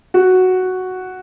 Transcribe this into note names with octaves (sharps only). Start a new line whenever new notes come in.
F#4